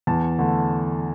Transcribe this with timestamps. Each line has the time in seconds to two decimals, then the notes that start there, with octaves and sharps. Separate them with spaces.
0.07 E2 A5
0.39 D3 A3